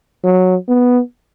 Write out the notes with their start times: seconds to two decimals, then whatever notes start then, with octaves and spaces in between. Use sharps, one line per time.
0.24 F#3
0.68 B3